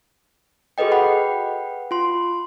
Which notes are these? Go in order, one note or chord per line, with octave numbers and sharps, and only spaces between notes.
F#4 G#4 A4 B4 D#5 G5
B4 F#5 G5 B5
F4 C6